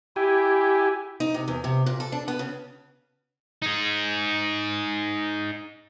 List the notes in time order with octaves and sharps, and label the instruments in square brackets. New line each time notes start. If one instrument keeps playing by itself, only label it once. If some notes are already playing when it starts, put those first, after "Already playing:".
[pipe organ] E4 G#5 [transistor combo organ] G4
[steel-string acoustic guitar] D#4
C3
E2
C3
A#2
A4
D4
B3
C#3
[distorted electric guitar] D#4 G#4